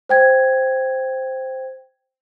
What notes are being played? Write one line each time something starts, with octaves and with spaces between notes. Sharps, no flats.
C5 G5 G#6